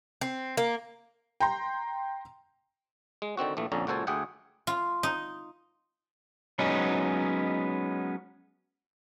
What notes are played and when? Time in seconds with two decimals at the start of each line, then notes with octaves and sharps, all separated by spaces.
0.21 C4
0.57 A#3
1.40 G5 A#5 C6
3.22 G#3
3.37 D3 D#3 C4 F#4
3.57 A#1 E3 A3
3.72 A#1 F2 D3 C#4 A#5
3.87 C#2 A#2 F#4 A4 C5 G#5
4.07 D2 G#4 E5 F#5 G5
4.67 F4
5.03 D#4
6.59 F#3 G#3 B3 C#4 D#4